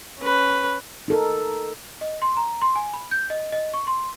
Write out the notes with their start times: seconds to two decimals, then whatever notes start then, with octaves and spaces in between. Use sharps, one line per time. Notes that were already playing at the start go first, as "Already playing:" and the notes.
0.20 C#4 B4
1.08 D#4 A4 A#4
2.01 D#5
2.22 C6
2.37 A#5
2.62 C6
2.76 G#5
2.94 B5
3.11 G6
3.30 D#5
3.52 D#5
3.74 C#6
3.87 C6